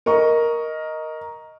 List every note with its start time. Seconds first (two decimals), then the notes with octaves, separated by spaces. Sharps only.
0.06 A#4 D#5 C#6